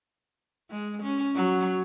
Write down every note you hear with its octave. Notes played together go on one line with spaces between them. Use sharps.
G#3
C#4
F#3